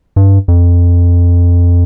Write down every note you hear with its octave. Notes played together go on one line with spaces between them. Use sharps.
G2
F2